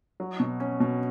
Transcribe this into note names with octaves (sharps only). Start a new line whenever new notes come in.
F#3
B2
C#4
B2